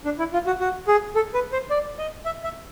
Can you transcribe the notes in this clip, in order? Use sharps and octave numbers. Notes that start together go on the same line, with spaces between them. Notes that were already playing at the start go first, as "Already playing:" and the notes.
D4
E4
F4
F#4
F#4
G#4
A4
B4
C5
D5
D#5
E5
E5